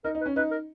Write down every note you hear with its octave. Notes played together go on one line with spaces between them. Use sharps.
D#4 A#4
D#4
B4
C#4
D#4 B4
A#4